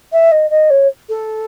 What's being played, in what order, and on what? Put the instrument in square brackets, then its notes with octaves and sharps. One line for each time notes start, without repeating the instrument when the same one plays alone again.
[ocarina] E5
D#5
D#5
C#5
A4